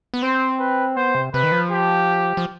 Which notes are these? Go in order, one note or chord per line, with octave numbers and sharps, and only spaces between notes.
B3
C4 C5
B4
B3 C5
C3
C3 B4
D#3
F3
G4
F3